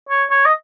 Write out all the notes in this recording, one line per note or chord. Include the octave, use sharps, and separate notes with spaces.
C#5
C#5
D#5